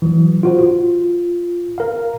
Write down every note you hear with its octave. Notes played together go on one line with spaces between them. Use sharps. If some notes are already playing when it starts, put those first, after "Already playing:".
E3 F#3
F4 F#4 C5
F4
A#4 F5